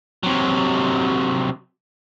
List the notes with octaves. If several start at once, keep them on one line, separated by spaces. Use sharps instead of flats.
C3 F#3